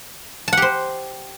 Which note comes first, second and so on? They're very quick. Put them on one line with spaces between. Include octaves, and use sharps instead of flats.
A5 F#5 G4 C5